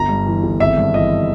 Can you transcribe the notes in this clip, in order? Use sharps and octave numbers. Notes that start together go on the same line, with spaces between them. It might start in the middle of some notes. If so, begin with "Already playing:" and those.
Already playing: G1 A#5
G2
E3
G1
G#1 E5
G2
E3 D#5